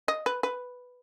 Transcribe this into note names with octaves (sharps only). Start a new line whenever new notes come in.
D#5
B4
B4